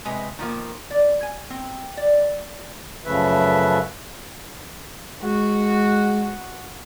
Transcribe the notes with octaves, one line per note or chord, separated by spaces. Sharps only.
C3 G#3 B4 D#5
D#3 F3 A#3
D5
G#5
C4
D5
F#2 C#3 F3 A3 B4 E5
G#3 F#4